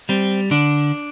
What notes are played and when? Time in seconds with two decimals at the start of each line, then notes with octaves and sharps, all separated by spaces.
0.09 G3 C4
0.51 D3 D4